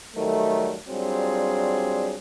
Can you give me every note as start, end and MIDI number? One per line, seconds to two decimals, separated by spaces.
0.15 0.77 51
0.15 0.77 54
0.15 0.77 55
0.15 0.77 57
0.88 2.17 54
0.88 2.17 55
0.88 2.17 60
0.88 2.17 62
0.88 2.17 65
0.88 2.17 68